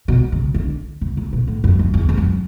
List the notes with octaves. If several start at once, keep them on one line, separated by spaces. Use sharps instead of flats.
B2
C#3
D3
C#3
C#3
B2
A2
F#2
F#2
E2
E2
F#2